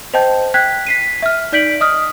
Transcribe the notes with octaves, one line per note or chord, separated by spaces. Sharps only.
C5 D#5 G5 A5 G6
G5 F#6 G#6 B6
B6 C7 D#7
E5 F6
D#4 D5 G6 B6 D7 F#7
D#5 D#6 F6